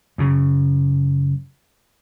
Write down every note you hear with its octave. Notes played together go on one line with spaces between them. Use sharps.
F#2 C#3